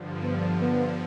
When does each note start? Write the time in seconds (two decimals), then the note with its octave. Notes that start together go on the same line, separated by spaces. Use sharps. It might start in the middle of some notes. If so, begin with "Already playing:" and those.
Already playing: G2 D3 F3
0.22 B3
0.61 B3